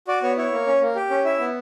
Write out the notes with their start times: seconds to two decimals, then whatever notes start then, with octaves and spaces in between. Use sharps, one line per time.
0.08 F#4 D5
0.22 B3 C#5
0.37 E4 C#5
0.52 A#3
0.67 C#4
0.81 A#3
0.95 G4
1.10 C#4
1.25 E4 E5
1.39 B3